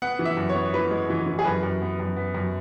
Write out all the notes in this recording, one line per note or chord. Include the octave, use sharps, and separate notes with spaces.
B3 F#5
E3
E5
F#2
C#5
B3
E3 B4
G#3
E3
E3
G#4
F#2 B4
F#2
B3
F#2
B3
F#2